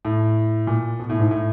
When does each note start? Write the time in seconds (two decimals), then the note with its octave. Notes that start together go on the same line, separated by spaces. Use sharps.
0.05 A2
0.67 A#2
1.00 B2
1.10 A2
1.19 G#2
1.31 A2